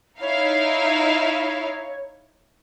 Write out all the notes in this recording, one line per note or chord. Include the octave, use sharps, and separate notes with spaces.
D#4 E4 C#5 F5